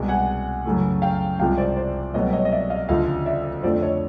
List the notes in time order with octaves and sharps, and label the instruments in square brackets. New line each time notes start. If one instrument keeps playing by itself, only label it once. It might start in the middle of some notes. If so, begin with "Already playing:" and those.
Already playing: [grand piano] C2 B2 G#3
F#5 G#5
F#2 C#3 E3 A3
F5 G5
C2 C3 F3 G#3 F5 G5
C5 D5
C5 D5
C2 B2 F#3 A3 C#5 D#5
C#5 D#5
D#5
D5 E5
D#5 F5
D2 C#3 F3 D#5 F5
D5 E5
F2 D3 F3 A3 C5 D5
C#5 D#5